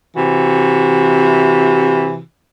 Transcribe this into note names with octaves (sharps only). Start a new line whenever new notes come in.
C3 E3 F#4